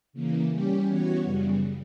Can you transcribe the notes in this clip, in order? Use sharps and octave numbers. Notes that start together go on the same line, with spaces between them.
C#3 E3 A#3
G3 C#4 G4
E3 B3 F#4 C#5
F#2 C#3 G3